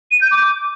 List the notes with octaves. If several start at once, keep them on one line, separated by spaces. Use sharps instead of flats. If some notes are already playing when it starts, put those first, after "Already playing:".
D#7
G6
D6